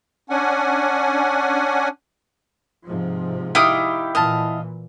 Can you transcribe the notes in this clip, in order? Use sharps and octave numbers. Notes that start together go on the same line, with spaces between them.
C#4 D4 F#5 G#5
G#2 C3 F3
D#4 E4 G4 F5 G5 D#6
A#2 E3 D#5 F5 A5